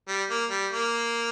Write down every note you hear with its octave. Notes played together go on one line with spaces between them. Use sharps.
G3
A#3
G3
A#3